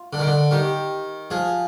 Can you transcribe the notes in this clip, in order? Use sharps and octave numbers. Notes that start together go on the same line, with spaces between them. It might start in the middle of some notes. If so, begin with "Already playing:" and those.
Already playing: F4
D3
D#3
D3
D#3 G4
F3 G#4